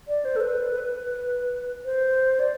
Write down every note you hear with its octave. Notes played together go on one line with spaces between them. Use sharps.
D5
C5
A4
B4
C5
D5